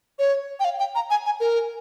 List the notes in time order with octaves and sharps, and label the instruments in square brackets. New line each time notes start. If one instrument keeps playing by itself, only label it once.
[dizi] C#5
G5
F5
G5
A#5
G#5
G#5
A#4